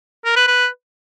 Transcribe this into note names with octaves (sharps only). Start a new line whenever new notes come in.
A#4
B4
B4